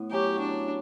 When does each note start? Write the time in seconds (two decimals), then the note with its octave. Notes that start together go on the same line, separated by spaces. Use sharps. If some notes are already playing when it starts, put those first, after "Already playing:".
Already playing: A2 B3
0.11 F#3 C#4 E4 G4
0.40 D4